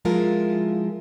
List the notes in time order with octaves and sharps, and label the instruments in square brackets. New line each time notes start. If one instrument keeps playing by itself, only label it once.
[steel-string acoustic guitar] F3 G#3 E4 F4 A#4